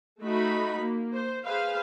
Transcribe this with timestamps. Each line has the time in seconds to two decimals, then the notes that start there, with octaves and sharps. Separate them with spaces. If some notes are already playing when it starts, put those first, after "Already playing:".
0.22 A3 D#4 F#4 B5
0.82 A#3
1.14 C5
1.46 G#4 B4 C5 F5